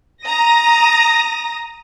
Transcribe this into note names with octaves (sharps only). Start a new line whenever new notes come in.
A#5 D#6 A#6